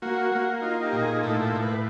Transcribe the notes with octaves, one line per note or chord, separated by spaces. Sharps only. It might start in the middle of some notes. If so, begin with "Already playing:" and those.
A#3 F#4
A#3
D#4 F4
G4
A#2
G#4
A2 A4
A4
A2
B4